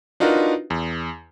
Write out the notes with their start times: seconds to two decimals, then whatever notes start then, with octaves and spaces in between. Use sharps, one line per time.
0.20 D4 D#4 F4 F#4 A#4 B4
0.70 E2